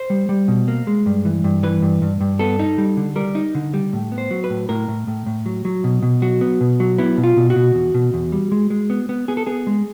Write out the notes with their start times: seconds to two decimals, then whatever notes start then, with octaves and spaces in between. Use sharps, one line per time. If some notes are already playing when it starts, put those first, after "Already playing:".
Already playing: C5
0.10 G3
0.29 G3
0.48 B2
0.68 A#3
0.87 G#3
1.06 G2
1.25 E3
1.44 G2
1.63 E3 B4
1.82 G2
2.02 G2
2.21 G2
2.39 B3 A4
2.59 D#4
2.78 G3
2.97 D3
3.16 G3 A#4
3.35 D#4
3.55 D3
3.74 G3
3.93 A2
4.12 B3
4.18 C5
4.31 F#3
4.44 B4
4.50 A2
4.69 A2 A#4
4.88 A2
5.07 A2
5.26 A2
5.46 F#3
5.65 F#3
5.84 B2
6.02 B2
6.22 F#3 F#4
6.41 B3
6.61 B2
6.80 F#3
6.98 B3 E4
7.18 B2
7.24 F4
7.37 B2
7.50 F#4
7.56 B2
7.75 E2
7.94 B2
8.14 E2
8.32 G3
8.52 G#3
8.70 G#3
8.90 B3
9.09 B3
9.28 B3 G#4
9.37 A4
9.46 B3 G#4
9.67 G#3